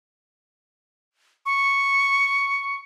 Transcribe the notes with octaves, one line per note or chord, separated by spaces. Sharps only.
C#6